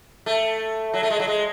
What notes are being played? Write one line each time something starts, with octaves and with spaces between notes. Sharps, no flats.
A3
F#3
A3
G#3
F#3
G#3